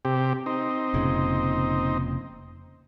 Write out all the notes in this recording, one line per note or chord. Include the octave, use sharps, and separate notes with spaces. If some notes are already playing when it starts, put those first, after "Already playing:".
C3 G4
C4 D#4
F1 A#2 C#3